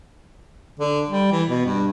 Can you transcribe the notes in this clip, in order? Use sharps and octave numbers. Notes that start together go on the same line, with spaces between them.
D3
G3
E3
B2
G2